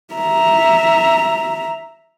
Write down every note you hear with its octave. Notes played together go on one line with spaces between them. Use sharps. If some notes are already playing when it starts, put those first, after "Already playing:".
E5 A#5